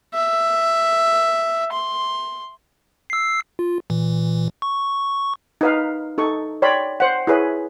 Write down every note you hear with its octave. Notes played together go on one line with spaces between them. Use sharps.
E5
C6
E6 C7
F4
A#2 E3
C#6
D#4 B4 F5
D#4 A4 C#6
C#5 D5 G5 B5 C6
C5 F#5
E4 G#4 B4 C#5